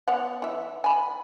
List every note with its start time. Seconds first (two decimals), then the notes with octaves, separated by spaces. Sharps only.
0.08 B3 C#5 F#5
0.42 E3 E5
0.84 G#5 B5